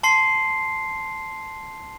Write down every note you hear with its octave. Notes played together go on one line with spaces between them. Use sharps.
A5 C6 C7